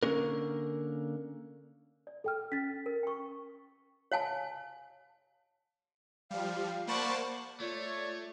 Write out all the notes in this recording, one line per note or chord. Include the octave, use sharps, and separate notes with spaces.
D3 A#3 C#4 D4 A#4
D5
A4 G5 F6
C#4 A6 B6
A#4
G5 C#6
C#5 F5 G#5 A5
F3 G3 F5
A#3 C5 D5 F#5 A5 B5 C#6
A3 F4 C#5 D5